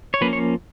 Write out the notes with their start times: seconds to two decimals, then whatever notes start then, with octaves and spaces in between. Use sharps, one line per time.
0.14 C#5
0.21 F3 A#3 C#4 B4
0.33 C#5